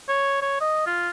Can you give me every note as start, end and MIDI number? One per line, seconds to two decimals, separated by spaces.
0.09 0.38 73
0.42 0.57 73
0.60 0.84 75
0.86 1.10 65